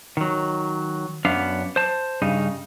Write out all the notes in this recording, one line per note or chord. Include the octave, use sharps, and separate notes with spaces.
D#3 F#3
F#2 B3 D4 F5
C5 A5
G2 C#3 D#4